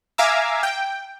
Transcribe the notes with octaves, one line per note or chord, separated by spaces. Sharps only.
E5 F5 G#5 A#5 D6 E6
G5